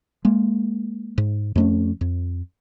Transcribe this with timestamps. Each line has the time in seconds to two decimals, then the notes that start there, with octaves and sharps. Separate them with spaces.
0.25 G#3 A#3
1.18 G#2
1.56 F2 A3 C#4
2.01 F2